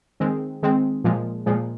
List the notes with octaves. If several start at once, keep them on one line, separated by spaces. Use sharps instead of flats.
D#3 G#3 C4
D#3 G#3 C4
A#2 F3 G#3
A#2 F3 G#3